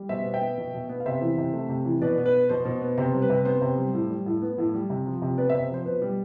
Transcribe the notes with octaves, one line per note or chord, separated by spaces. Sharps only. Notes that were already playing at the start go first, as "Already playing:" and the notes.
Already playing: G3
B2 C5 E5
B3
E5 G5
B3
B2
B2
B3
F5
C3 C5 E5
E3
C3
A3
C3
E3
B2 B4 D5
B3
B4
B3
B2 C5
B2
B3
C3 C5
G3
B4
C3
B3 C5
C3
G3
A2
G3
A2
B3
A2
G3
C3
F3
C3
B3 B4 D5
C5 E5
C3
F3 C5
B2 B4
G3